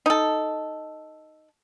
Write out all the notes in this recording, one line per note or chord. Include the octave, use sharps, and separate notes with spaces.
D#4 A4